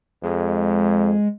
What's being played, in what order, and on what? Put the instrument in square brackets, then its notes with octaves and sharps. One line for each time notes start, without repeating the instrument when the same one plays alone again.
[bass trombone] F2 [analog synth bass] G#3